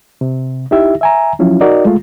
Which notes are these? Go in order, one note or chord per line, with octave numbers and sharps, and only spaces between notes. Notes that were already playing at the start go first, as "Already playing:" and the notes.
C3
D#4 E4 G4 E5
E5 G#5 A#5
F3 F#3 C#4 E4 F4
D#4 F#4 A#4 D5 D#5
G#3 A3 F4